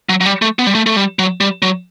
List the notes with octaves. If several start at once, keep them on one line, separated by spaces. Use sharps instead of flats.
F#3
F#3
G3
A3
B3
G3
A3
A3
G3
F#3
G3
F#3